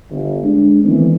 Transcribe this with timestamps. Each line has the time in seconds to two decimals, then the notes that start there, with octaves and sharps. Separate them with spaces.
0.11 G1
0.44 G#3 D4
0.84 D#3 E3 A3 B3 C4 D4